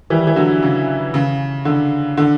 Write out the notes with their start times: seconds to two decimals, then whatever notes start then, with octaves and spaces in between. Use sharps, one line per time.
0.10 E3 G3
0.27 E3
0.36 D3 F#3
0.63 C#3
1.14 C#3
1.65 D3
2.17 D3